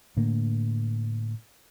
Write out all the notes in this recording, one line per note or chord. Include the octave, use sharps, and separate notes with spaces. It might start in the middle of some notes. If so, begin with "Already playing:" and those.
A2 D3 A#3